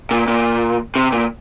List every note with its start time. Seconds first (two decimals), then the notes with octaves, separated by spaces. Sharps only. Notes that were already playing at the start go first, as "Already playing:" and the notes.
0.11 A#2
0.28 A#2
0.96 C3
1.12 A#2